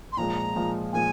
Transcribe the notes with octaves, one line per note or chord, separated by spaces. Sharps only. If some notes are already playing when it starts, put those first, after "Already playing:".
C6
A#2 F3 G#3 A#5
A#2 F3 G#3
A#2 F3 G#3 G#5